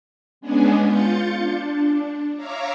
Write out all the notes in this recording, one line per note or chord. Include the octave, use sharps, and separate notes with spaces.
G#3 B3 C#4 D4 G#4
F4 G6 A6 C#7
D4
C#5 E5 F5 A#5 D6